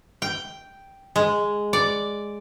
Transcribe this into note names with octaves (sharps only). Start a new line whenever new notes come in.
G5
G#3
D5